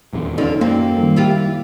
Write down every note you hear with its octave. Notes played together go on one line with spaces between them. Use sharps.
D#1 E2
D3 C#4 D#4 F4
F#2 A#3 C4
D#3 G3
E4 F4 G4